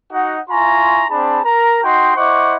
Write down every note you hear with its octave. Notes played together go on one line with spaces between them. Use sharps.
D#4 F#4 D#5 F#5
E4 F4 G#5 A#5 C6 C#6
C4 D4 G#4 A5 B5
A#4 A#5
D#4 F#4 D#5 G5 C6
E4 C5 D#5 F#5 C#6 D6